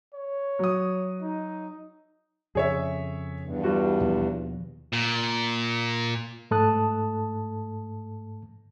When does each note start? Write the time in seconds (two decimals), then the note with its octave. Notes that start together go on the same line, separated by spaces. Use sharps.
0.14 C#5
0.59 F#3 D#6
1.22 D#4
2.55 F2 C#3 G#4 C#5 E5
3.40 E2 G2
3.64 G3 F4 F#4
4.00 D#2 B2 F3
4.93 A#2
6.51 G#2 A3 A4 A5 D#6 F#6